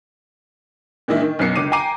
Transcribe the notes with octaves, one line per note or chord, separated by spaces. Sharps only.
A#2 D#3 E3 G#3 D4 E4
D#3
B1 F#2 B3 C7 C#7
C#2 D3 D6 D#7
G5 G#5 A#5 D6 C7 D#7